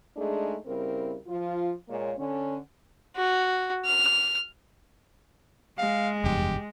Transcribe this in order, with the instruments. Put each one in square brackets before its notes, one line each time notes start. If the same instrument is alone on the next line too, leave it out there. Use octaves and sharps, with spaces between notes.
[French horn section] G#3 A3 D4 D#4 G#4
C#3 G3 C4 E4 A#4
F3 F4
A#2 G#3 A#3 C#5
D3 C#4
[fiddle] F#4
F6
[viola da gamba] G#3 [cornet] F5
[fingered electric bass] F1 E2 G2 [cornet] G4